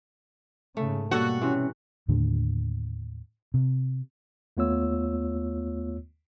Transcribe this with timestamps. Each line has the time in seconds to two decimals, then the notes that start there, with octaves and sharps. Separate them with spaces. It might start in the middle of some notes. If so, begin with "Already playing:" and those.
0.77 G#2 C#3 A3
1.11 B2 G3 A#3 F#4 A4 C#5
1.42 C3 E3 C#4
2.08 D#2 A2 D3
3.54 C3
4.57 D#2 A3 B3 F4 C#5 E6